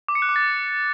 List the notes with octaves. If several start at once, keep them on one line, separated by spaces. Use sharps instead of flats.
D6
C#7
F#6
D6
A6